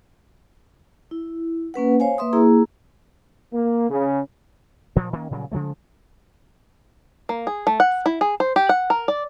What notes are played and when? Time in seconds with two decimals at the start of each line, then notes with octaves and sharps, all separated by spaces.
1.11 E4
1.74 A#3 C#4 B4 F#5
2.00 C5 C#5 F5 G#5
2.18 A#3 B4 E5 C6 D#6
2.33 A#3 E4 G#4 A#5
3.53 A#3
3.90 C#3
4.96 G2 A#2 F3
5.13 D#3 A#3 C#4
5.31 A#2 C#3 F#3 G3
5.52 C#3 F3 G#3 A3
7.29 A#3
7.47 G#4
7.67 A3
7.80 F#5
8.06 E4
8.21 G#4
8.40 C5
8.56 G4
8.69 F#5
8.90 A#4
9.08 D5